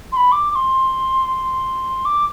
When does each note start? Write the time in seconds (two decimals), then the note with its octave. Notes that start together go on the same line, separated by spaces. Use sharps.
0.12 C6
0.17 B5
0.32 D6
0.51 D6
0.56 C6
2.05 D6